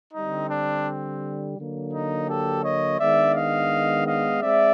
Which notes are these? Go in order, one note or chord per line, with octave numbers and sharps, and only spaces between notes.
D3 G3 C4 D#4
D4
D3 F#3 A#3
D#4
G4 A4
C#5 D#5
D#3 G#3 B3 D4 D5 E5
D#5 F5
D#5 F5
G#3 C4 D5 E5